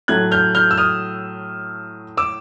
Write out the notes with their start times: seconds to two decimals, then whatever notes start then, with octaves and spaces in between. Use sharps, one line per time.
0.08 A2 F#3 A3 F#6 G#6
0.31 F6 G6
0.55 F6 G6
0.71 E6
0.77 D#6 F6
2.17 D6 E6